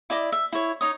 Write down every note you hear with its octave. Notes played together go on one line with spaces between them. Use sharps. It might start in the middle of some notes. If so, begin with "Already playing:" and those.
E4 D5 D#5 D6
E5
E4 C#5
D#4 C#5 D#6